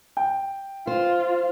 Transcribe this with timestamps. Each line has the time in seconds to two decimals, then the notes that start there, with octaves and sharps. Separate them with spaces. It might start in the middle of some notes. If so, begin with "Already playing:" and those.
0.17 G5
0.87 F4 C5